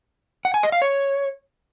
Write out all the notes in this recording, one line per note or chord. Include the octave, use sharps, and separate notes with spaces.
F#5
G#5
D#5
F5
C#5